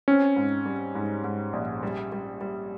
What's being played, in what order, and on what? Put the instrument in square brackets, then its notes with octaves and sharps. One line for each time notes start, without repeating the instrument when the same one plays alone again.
[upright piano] C4 [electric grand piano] C#4
[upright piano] G#2
G3
G#2
G#2
A#1
G3
G3
G3